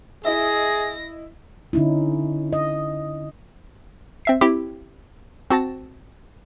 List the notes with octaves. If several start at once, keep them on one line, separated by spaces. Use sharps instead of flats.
E4 G#4 D#5 E5 A#6
D3 C#4 D#4 E4
D#5
C4 E5 C7
C4 E4 G4
C4 F#4 A5 A#6